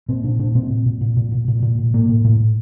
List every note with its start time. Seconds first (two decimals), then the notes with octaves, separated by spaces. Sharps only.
0.09 A#2 C4
0.24 A#2 D4
0.39 A#2 D4
0.55 A#2 C4
0.70 A#2
0.86 A#2
1.01 A#2
1.17 A#2
1.32 A#2
1.48 A#2
1.62 A#2
1.79 A#2
1.94 A2 A#3
2.09 A2
2.24 A2
2.40 A2